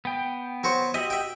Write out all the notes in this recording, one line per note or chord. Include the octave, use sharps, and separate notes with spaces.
B3 G5
F#3 F#4 C5
F#4 G4 D#5 E5
E5 G5